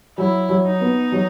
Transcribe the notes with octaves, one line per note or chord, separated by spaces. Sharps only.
F#3 E4
F#3
D#4
B3
F#3